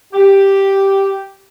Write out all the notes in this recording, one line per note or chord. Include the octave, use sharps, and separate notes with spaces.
G4